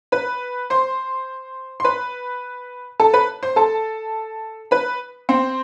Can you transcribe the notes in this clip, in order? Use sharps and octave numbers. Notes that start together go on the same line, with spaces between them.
B4 B5
C5 C6
C6
B4 B5
A4 A5
B4 B5
C5 C6
A4 A5
B4 B5
C4 C5